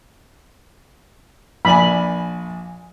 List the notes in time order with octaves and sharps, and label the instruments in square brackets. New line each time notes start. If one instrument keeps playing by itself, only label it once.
[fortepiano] A#1 D5 G#5 [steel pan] B5